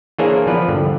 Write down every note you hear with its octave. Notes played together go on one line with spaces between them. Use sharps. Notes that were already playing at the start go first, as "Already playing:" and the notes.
E3 A#3 D4 G#4 C5 C#5
F3 B3 B4 D5
G2 D3